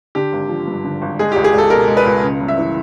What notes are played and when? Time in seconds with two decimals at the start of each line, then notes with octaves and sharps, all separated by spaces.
0.15 D3 G4
0.33 G#1
0.49 F3
0.67 G2
0.84 D3
1.02 G#1
1.19 G#3 G#4
1.32 C#2 G4
1.44 G#4
1.54 C#2 A4
1.70 B2 A#4
1.88 G#3
1.97 B4
2.05 C#2
2.23 C#3
2.40 G1
2.48 E5
2.58 E3